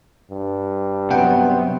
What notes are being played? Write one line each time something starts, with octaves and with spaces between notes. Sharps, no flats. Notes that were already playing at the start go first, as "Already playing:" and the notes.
G2
C3 F#3 B3 F#5 G5